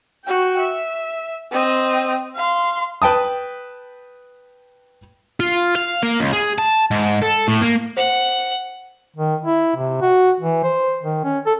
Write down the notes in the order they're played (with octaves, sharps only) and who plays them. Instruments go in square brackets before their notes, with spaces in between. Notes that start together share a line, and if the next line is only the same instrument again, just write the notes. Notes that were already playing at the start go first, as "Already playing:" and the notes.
[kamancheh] F#4 G5
E5
C4 D#5
F5 C6
[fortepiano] B4 G5 A5 D#6
[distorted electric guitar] F4
F5
A#3
C#2
G#4
A5
G#2
A4
A2
A#3
[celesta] C5 [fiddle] F#5
[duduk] D#3
E4
C3
F#4
E3
C5
D#3
C#4
A4